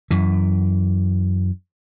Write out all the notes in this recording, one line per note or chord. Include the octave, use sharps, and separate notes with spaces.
F#2 E3